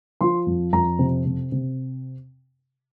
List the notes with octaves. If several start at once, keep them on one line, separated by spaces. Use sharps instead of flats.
F3 C6
F2
F2 A#5
C3
C3
C3